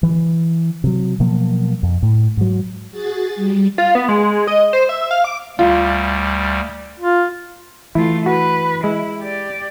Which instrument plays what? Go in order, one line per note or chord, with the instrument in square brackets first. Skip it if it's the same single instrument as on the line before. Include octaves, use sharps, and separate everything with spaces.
[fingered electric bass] E3
C3 F#3
B2 F3 F#3 A#3
F2
A2
G#2 F#3
[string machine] F#4 G#4 A6
G3
[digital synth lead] F4
B3
G#3
G#3
D#5
C5
E5
F5
D6
[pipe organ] D2 G3 [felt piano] F4
[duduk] F4
[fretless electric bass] E3 [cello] A3 F4 [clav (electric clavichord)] E4
[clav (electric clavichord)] F#4 [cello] B4
[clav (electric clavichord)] G#3 [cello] E4
[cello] G4 D5